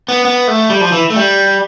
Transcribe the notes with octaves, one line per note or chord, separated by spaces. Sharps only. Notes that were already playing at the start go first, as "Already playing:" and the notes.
B3
B3
A3
G3
F3
E3
A3
G3